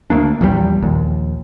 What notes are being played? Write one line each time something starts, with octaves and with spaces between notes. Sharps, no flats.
D2 A#3 D4
A#1 E2 E3 G3
A#1 D#2